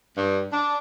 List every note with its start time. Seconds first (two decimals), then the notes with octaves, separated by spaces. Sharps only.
0.16 G2
0.52 D4